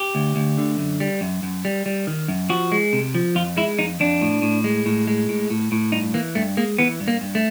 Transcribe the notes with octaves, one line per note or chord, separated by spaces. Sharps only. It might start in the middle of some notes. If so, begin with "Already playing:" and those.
Already playing: G4
D2
D2
D3
F#2
G3
F#2
F#2
G3
G3
D#3
F#2
F3 F#4
G#3
C3
F3
F2 F4
G#3 E4
F2 D#4
F2 D4
A2
A2
G#3
A2
G#3
A2
A2
A2
G2 D#4
E3 A#3
G2 A3
G#3 A#3
E3 B3
G2
A#3
G2
A3